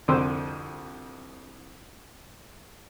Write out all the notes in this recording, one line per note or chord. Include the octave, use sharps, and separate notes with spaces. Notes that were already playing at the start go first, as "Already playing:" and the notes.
C2 F2 D3 C5 G5 E6